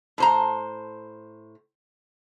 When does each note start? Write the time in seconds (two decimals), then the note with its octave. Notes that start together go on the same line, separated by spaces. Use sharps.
0.18 A2 C5 A#5